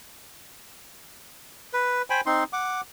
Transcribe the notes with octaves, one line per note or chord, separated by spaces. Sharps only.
B4
C5 G5 G#5 B5
C4 D#4 C6
F#5 D6